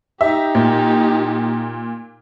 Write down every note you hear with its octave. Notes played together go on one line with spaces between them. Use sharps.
D#4 G4 E5
A#2